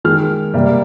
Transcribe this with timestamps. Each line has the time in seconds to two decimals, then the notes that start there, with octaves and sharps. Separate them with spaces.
0.04 D#3 G#3 F6
0.54 C3 G3 A#3